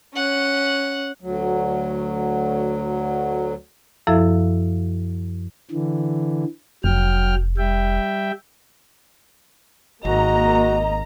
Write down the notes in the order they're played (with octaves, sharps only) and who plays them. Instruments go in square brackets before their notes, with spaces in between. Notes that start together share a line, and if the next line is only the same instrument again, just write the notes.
[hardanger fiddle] C#4 F#5
[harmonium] D2 F#3
[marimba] F#2 F3 E4 A4 E5 F5
[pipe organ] D3 E3
[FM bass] F1 [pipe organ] F#3 G5 F6
[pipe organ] G3 E5 G5
[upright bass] G#1 [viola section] A#3 A#5 [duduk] F#4 [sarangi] D#5